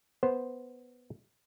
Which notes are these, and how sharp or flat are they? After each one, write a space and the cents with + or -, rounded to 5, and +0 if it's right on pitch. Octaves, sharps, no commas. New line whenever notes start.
B3 +0 C5 +0